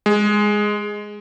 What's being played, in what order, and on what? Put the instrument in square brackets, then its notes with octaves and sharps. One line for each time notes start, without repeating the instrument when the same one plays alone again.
[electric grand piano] G#3